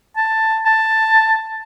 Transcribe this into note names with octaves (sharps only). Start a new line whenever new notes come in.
A5
A5